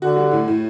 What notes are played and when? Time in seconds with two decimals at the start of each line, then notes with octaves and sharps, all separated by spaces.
0.01 D3 F#4
0.16 G3
0.31 A2
0.48 A2